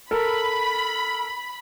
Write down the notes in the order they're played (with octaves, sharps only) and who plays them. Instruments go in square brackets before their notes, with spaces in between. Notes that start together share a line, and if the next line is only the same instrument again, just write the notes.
[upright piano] A4 A#4 [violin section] B5